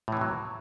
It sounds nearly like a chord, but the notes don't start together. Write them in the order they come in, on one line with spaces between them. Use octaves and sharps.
A2 E3 C3 F#3